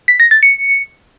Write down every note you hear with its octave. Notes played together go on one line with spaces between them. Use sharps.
B6
A#6
A6
C#7